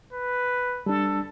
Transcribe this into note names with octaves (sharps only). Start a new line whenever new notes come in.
B4
G3 D4 A4